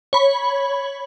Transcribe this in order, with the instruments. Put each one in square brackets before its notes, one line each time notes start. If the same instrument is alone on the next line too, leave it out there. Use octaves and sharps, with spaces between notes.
[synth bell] C#5 B5